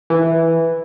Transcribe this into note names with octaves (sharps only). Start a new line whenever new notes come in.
E3